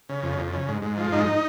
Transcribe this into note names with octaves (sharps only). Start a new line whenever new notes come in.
C#3
F2
F2
C#3
G#2
G#2
F3
G#2 D#4